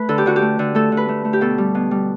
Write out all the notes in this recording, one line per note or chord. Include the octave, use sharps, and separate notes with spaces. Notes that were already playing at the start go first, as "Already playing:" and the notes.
Already playing: A3 B4
D3 A4
G4
D3 F#4
G4
A3
D3
A3 A4
D3
B4
A3
A3
G4
B2 A4
G3
B2
G3